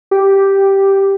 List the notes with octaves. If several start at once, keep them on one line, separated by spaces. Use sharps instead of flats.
G4